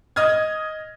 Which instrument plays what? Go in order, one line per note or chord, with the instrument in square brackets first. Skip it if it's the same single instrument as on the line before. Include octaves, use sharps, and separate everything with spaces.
[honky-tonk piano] D#5 D#6 F6 G#6